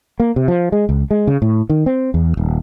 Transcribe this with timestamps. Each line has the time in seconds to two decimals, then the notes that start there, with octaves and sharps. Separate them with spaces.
0.20 A#3
0.36 C3
0.48 F3
0.72 G#3
0.89 C#2
1.11 G#3
1.27 C#3
1.42 A2
1.70 D#3
1.86 C4
2.14 E2
2.37 D#1